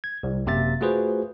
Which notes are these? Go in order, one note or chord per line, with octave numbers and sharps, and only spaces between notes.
G#6
C2
G#1 F#2 C3 A#3 E5 A6
A3 F4 F#4 G#4 B4 C5